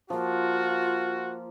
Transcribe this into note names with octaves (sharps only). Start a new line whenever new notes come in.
F3 A#3 F4 F#4